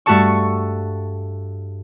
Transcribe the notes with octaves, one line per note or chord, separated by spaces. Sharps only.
G2 A3 F#4 A4 A5 C#6